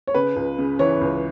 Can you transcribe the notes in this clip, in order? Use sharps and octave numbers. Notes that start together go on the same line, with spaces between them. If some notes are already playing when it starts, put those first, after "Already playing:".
C#5
C#3 B4
C#2
C#3
E3 C#5
C#2